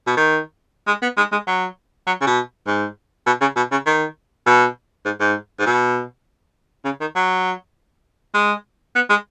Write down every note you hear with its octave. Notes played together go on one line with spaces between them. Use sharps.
B2
D#3
G#3
B3
G#3
G#3
F#3
F#3
C#3
B2
G#2
B2
C#3
B2
C#3
D#3
B2
G#2
G#2
G#2
B2
C#3
D#3
F#3
G#3
B3
G#3